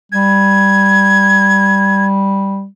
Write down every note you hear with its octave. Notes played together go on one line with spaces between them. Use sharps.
G3 G#6